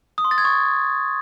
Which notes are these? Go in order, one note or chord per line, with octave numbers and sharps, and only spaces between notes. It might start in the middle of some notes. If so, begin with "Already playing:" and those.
D#6
C6
A6
G#6
C#6